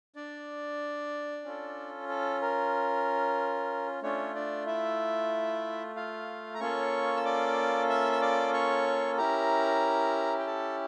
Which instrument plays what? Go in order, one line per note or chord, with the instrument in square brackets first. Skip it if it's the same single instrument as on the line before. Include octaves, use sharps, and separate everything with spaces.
[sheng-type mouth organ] D4 D5
C#4 F4 A4
A4
A#4
A3 C#4 D4 F4 C#5
D4 D5
E4 E5
F4 F5
A#5
A#3 C#4 F4 A4 C#5 C#6
E6
D5 D6
E5 E6
E6
D5 D6
C#5 C#6
C#4 E4 G4 A#4 A#5
G5
A4 A5